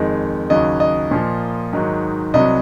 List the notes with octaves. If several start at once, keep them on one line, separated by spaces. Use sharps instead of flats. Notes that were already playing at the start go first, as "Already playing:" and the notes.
Already playing: F2 D#3 G#3
D#2 C#3 F#3 D#5
D#5
A#2 F3 A#3
G#2 D#3 F#3
C2 C3 F#3 D#5